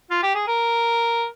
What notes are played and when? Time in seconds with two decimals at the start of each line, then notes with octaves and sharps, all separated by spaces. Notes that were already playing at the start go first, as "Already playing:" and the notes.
0.11 F4
0.23 G4
0.35 G#4
0.48 A#4